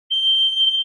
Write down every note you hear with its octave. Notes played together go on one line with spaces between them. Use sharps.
G7